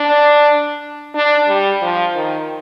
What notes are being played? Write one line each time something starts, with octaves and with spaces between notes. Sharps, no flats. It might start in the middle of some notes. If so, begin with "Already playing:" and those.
Already playing: D4
D4
G3
F3
D#3